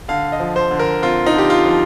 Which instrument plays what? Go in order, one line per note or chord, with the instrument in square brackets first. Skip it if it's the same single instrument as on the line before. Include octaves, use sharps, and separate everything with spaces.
[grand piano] D3 F5
D#5
F3
C5
D3
A#4
C4 F4
D#4
D3 G4
F4
F3